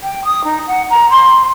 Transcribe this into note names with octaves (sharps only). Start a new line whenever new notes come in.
G5
D#6
D#4
F#5
A#5
C6